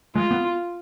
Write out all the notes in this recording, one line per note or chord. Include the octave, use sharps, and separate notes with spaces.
G#3 F4
B3